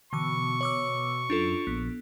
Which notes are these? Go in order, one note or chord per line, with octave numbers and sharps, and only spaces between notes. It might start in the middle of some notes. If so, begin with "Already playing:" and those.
B2 D3 E3 C#6 D6
C#5 D6 E6
F#2 D4 F4 A4
A#1 B3